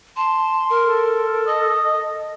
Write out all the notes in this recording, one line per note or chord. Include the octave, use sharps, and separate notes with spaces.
A5 C6
A#4
A4
D#5 D#6